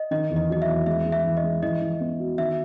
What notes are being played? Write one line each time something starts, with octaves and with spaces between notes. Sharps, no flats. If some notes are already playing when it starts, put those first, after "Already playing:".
Already playing: D#5
D#3 D#5
E2
D#5
F#3 D#5
E5
E2
G#3 E5
G#3
E5
E3
D#5
G#3
E3 D#5
E3
B3
F#4
D#3 E5